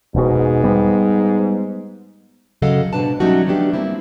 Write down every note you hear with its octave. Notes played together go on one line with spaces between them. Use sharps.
E1 G#2 B2
G3 B3
C#3 F#3 A4 D#5 F5 F#5
G#2 B2 D#3 D4 B4 A5
F#3 G3 A3 C#4 D#4 F#4
F3 F#3 A3 B3 D4 G4
G3 A#3 C4 E4